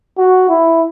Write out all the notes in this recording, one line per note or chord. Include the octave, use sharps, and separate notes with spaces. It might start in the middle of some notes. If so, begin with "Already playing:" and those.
F#4
E4